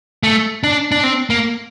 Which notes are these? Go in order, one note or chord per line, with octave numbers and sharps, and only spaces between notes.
A3
D4
D4
C4
A#3